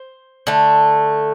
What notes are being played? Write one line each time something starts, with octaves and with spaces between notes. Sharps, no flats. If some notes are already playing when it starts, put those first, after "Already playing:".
Already playing: C5
D3 A3